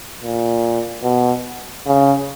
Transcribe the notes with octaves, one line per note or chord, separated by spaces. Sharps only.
A#2
B2
C#3